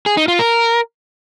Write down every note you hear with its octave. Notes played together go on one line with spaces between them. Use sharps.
G#4
D#4
F4
A#4